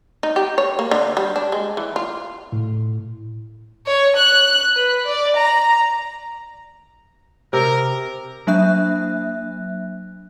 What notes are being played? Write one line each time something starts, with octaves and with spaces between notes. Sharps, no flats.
D#4
G4
C#5
A#3
D3
G3
D4
G#3
E3
F4
A2
C#5
F#6
B4
D5
A#5
C3 A#4
F#3 A#3 D4 E5 F#6